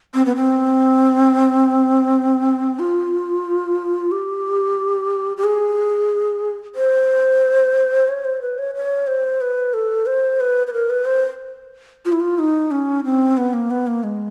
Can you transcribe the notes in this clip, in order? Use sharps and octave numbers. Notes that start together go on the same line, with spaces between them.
C4
B3
C4
F4
G4
G4
G#4
C5
C#5
C5
B4
C#5
C#5
C5
B4
A4
C5
B4
B4
A#4
B4
C5
F4
E4
F4
D#4
C#4
C4
B3
A#3
B3
A#3
G#3